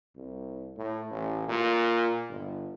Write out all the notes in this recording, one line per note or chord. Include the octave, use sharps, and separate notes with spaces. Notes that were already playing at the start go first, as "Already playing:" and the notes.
C2
A2
A1
A#2
G1